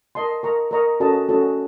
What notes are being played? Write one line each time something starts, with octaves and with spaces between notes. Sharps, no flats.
A#4 D#5 A5 C6
A#4 D#5 A#5 C#6
A#4 D#5 A#5 C#6
C#4 F#4 A4 D#5 A5
C#4 F#4 A4 D#5 A5